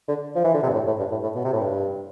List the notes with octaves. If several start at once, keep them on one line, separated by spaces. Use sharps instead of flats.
D3
F3
E3
D3
C3
G2
A2
A2
G2
A2
A2
B2
C3
A2
G2